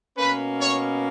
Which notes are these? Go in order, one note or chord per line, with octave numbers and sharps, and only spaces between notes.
B2 A#3 C#4 B4
C#5